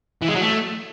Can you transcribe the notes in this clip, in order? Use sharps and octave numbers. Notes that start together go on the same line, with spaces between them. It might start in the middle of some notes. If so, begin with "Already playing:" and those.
E3
G#3
F#3
A3